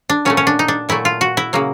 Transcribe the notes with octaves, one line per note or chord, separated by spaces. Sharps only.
D4
A#2 F#3 A3 C#4
C#4
D4
D#4
D4
A#2 F#3 A3 E4
F4
F#4
E4
C#3 F#3 A#3